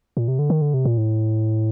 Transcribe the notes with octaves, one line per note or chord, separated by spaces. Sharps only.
A#2
C3
D3
D#3
D3
C3
A#2
A2